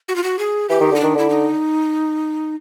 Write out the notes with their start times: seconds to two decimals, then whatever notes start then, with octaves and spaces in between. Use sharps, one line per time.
0.08 F#4
0.16 F4
0.24 F#4
0.39 G#4
0.69 E3 G4
0.81 D#3
0.92 D3 D#4
1.00 D#3 D4
1.15 D3 E4
1.30 D#4